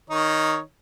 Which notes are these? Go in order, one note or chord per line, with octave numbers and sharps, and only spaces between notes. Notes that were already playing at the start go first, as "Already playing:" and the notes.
D#3 D#4 C#5